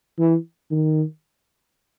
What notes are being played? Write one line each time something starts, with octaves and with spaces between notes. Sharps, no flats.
E3
D#3